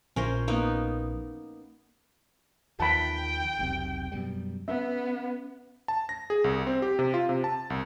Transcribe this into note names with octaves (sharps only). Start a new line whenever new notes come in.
A#1 C#4 A#4 C5
A#3 B3 D#4
D#2 D#3 F3 G5 A5 B5
E1 B1 C3
F#2 B2 G3
B3 C#4 E5
A5
A#6
G#4
C2
C4
G4
C3
F4
C3
A5
C2